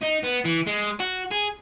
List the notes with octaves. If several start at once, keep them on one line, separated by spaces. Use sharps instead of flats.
D#4
B3
E3
G#3
F#4
G#4